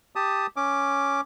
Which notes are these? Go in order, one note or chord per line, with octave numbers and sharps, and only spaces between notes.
G4 A5 D#6
C#4 D6